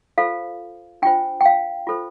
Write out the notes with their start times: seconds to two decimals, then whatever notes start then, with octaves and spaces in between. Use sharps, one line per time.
0.18 F4 A4 C5 F5
1.02 D4 F4 C5 G5
1.41 G5
1.46 F5
1.87 F4 A4 C5